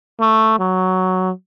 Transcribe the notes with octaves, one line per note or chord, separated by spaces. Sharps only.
A3
F#3